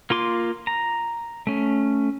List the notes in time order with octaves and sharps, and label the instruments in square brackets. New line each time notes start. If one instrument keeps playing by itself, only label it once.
[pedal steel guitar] A#3 F4 C6 D6
A#5
A3 C#4